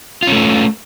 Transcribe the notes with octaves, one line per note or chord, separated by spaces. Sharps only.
A3 C#4 F4